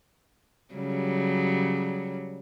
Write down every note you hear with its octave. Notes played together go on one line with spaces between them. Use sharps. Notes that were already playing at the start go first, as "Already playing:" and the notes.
C#3 F#3 G3